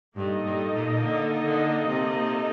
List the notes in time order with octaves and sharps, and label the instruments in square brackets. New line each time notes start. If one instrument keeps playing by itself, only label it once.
[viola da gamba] G2 [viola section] A#3 D#4 A4 D#5
[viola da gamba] G2
A#2
D3
D3
C3